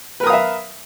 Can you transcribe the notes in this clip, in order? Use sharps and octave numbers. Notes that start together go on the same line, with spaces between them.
A#4 B4 E5 F5 D#6